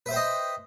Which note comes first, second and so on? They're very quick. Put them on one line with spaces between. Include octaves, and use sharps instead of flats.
B4 E5 C5 G5 D#5